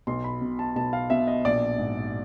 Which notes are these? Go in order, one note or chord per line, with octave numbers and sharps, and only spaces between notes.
B1 C6
B5
B2
A5
B1 A5
F5
B2 E5
D#5
A#1 D5
G#2